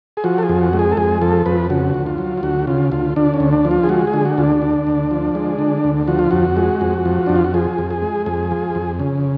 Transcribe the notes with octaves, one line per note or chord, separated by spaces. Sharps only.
G#4
F3 F#4
A4
G#4
F2
F#4
G#3
G#4
A4
F2 G#4
F3 A4
F2 B4
C#3 F#4
D2
F4
F#3
F4
D2 F#4
C#3 F4
D2 F4
D3 D4
C#4
D2
D4
F3
F4
G#4
G#3 F#4
G#4
D3
F#4
D2 F4
D4
D3
D2
F3
G#3
D3
D2
F3 F#4
F4
F2 F#4
G#3
F2
F3
F2 D4
F4
F#4
F3 G#4
F2
G#4
G#3
F2 G#4
F3
F2
C#3